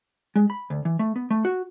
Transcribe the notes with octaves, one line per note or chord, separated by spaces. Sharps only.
G#3
B5
D2
E3
A3
B3
A3
F#4